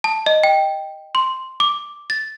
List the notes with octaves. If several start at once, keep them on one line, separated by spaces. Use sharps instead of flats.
A5
D#5
G5
C6
D6
A6